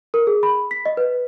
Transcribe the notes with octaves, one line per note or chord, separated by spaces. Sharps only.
A#4
G#4
B5
B6
D#5
B4